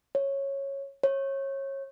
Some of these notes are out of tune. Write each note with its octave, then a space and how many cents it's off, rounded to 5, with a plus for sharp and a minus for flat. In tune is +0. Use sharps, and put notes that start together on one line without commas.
C#5 -10
C#5 -25